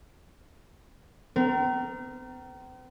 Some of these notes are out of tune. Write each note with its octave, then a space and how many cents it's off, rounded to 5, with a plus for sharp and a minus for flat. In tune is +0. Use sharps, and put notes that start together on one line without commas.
C4 -45 A#4 +0